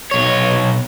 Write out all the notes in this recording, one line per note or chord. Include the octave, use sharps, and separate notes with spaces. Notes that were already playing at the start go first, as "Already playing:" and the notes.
B1 C#5